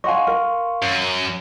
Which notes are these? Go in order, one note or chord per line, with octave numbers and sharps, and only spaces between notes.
D#5 F5 F#5 G#5 C6 C#6
A#4
F#2